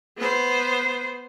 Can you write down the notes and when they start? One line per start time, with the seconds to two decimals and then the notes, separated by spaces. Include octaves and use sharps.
0.17 B3 C5